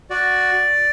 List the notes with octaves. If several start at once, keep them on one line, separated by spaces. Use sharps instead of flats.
F#4 D5